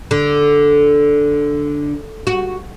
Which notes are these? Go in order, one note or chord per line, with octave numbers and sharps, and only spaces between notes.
D3
F#4